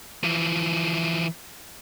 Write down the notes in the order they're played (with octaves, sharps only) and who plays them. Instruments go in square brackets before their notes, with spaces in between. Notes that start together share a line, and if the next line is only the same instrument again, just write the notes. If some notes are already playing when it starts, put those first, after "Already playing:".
[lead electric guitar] E3 F3